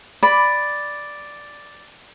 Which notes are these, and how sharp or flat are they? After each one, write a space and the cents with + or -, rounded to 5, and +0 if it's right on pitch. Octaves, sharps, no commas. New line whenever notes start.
D5 +0 B5 +0